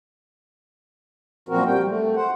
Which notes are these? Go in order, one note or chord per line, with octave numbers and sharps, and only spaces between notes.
F#2 A#2 F3 C4 F#4 A#4
G3 G5
A3
C5 F#5